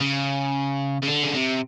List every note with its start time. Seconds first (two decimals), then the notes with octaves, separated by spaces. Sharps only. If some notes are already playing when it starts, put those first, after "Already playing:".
0.01 C#3
1.02 C#3
1.07 D3
1.23 C#3
1.34 C3